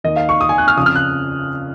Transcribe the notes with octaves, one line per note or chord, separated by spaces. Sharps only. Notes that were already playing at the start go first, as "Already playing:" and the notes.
D#2 D#3 D#5
F5
C#6
D#6
G#5
F#6
F6
F2 C#3 F3 D#6
F6
F#6